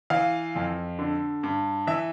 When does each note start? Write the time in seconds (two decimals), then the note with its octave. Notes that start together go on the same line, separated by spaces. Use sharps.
0.10 E3 F5
0.56 F2
0.99 D3
1.43 G2
1.87 E3 E5